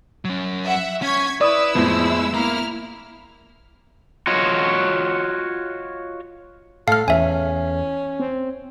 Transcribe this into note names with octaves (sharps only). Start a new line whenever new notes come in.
F#3 C#4
E5 F#5
C#4 C#6 G#6 B6
E4 B4 D5 D#6 E6
F2 A2 G#3 B3
A#3 E4 A#5 F6
F4 F#4 C#5 D#5
A2 A4 F5 F6
E2 C#4 E5 G#5
C4